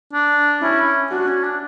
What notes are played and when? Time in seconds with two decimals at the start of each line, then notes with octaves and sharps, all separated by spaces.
0.13 D4
0.62 C#4 E4
1.11 D4 F#4
1.28 C#4
1.44 D4